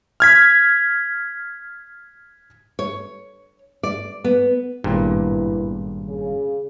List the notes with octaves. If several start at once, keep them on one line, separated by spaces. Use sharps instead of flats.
F6 G#6 B6
C#5
D5
B3
G#1 G2 A#2 B3 E4
C#3